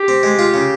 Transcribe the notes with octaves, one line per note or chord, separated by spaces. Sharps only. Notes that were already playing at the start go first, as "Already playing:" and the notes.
Already playing: G4
C4
G#3
F4
C#3